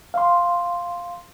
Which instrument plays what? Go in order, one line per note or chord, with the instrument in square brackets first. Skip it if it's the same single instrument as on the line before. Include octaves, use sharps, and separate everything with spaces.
[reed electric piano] F5 C6